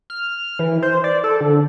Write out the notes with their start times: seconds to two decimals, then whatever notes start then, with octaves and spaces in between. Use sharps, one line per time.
0.10 F6
0.59 E3
0.83 C5
1.04 D5
1.24 A4
1.41 D3